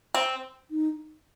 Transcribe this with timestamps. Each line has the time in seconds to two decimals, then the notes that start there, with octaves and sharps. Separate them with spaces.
0.14 C4
0.71 D#4